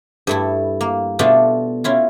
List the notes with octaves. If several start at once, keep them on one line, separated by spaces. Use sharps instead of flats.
G2 A3 E4
A#3
B2 A3 D4 F4 E5 A5
C#4 E4 F4